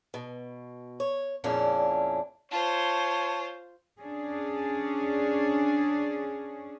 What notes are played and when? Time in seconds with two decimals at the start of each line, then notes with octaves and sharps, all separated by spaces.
0.14 B2
1.00 C#5
1.44 F2 A#2 C#3 C#4 D4 E4
2.52 F4 C5 C#5 A5
4.00 C#4 D4 G#4